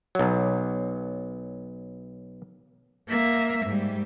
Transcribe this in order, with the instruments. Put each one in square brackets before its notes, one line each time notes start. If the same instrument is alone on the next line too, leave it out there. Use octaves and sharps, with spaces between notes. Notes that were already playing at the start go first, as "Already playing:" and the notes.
[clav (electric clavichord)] B1 F#3
[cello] A#3 E5
G#2 G3